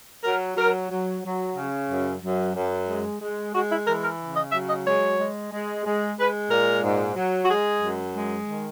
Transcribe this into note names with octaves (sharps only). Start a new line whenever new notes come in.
F#3 A#4
F#3 A#4
F#3
F#3
C#3
F#2
F#2
F#2
G#3
G#3
G#3 F#4
E4
E3 A#4
A#4
C#3
D#5
F#3 E5
D#5
G#3 C#5
G#3
G#3
G#3
G#3 B4
A#2 A#4
G#2
F#3
F#4
G#3 G#4
F#2
G#3
D#3